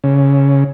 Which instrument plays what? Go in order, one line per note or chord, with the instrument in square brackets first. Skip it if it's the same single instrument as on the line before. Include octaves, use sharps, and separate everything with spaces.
[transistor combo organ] C#3